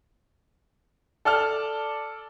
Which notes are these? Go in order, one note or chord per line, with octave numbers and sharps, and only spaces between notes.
A4 D5 A5 F6